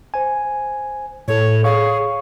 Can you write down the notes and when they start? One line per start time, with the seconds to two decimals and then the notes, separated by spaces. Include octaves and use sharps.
0.14 C5 G#5
1.28 A2 A4 C#5
1.64 G#4 C#5 F5 C#6